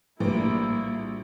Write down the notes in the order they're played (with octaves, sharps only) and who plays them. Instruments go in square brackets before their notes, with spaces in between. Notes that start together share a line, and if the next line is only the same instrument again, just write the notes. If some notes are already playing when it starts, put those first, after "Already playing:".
[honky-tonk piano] A#1 D7 [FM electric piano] A2 G3 [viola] A#3 E4